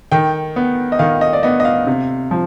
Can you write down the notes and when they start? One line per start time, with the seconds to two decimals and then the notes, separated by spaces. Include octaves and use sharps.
0.12 D#3 G5
0.56 B3
0.92 D#5
0.99 D#3 F5
1.21 D#5
1.33 D5
1.43 B3 D#5
1.60 D#5
1.65 F5
1.87 C3
2.31 F3